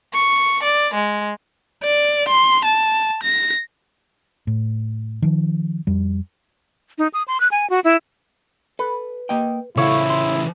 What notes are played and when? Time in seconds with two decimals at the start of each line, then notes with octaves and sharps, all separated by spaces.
0.13 C#6
0.63 D5
0.94 G#3
1.84 D5
2.28 C6
2.64 A5
3.23 A#6
4.47 A2
5.22 D#3 F3
5.87 F2 G3
6.98 D#4
7.14 D#6
7.28 C6
7.40 F#6
7.51 G#5
7.70 F#4
7.84 E4
8.79 A4 B4
9.29 A#3 D#5 G5
9.77 C#3 E3 E4 A4 C#5 F5 F#5
10.10 C6